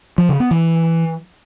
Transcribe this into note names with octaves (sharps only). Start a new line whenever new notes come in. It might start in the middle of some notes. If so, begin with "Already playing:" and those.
F3
C#3
B3
E3